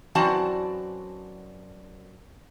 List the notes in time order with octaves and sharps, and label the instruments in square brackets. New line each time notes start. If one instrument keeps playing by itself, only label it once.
[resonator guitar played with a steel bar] F#2 E3 C4 F#4 D5 A5